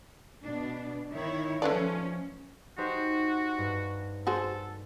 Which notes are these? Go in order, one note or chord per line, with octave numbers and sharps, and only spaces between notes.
B2 D4
D#3 E4 C#5
F3 A3 C#4 B4 D5
D#4 F#4 G4 C5
G2
F#4 G#4 A4 C5